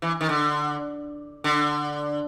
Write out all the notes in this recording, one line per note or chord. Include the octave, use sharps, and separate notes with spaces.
E3
D#3
D3
D3